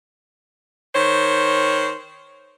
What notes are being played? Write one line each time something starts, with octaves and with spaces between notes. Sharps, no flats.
D#3 C5 C#5